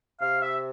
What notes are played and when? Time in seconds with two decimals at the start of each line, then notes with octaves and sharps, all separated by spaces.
0.21 C3 F5
0.42 E5